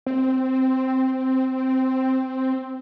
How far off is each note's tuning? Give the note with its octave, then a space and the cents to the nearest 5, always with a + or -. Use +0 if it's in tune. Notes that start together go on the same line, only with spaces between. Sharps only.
C4 -5